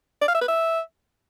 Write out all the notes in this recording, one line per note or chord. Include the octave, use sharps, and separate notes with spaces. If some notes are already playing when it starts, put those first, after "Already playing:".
D5
F5
E5
B4
E5